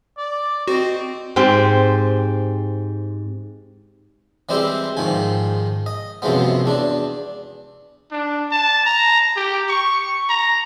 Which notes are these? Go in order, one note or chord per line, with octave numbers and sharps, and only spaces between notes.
D5
C4 F#4 D#5
G#2 C4 G4 C6
E3 G3 G#3 C4 E4 G4
G#2 D#3 F3 G#5
D#5
F#2 C3 E3 F3 G#3 B3
E2 D4
D4
A5
A#5
G4
C#6
A#5